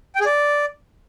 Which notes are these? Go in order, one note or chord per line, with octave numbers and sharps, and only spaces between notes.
G5
G#4
D5